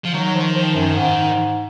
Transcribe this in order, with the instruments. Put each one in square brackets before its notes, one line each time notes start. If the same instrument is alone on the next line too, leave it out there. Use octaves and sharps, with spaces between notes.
[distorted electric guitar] F3
[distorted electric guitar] D#3 [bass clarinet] F#3
[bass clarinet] F#3
F3
F3
F#2
G#2